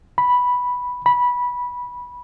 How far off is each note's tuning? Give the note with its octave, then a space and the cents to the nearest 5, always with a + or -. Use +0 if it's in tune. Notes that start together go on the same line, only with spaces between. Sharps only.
B5 -5
B5 -15